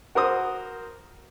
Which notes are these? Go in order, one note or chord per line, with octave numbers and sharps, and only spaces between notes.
F#4 A#4 C5 D#6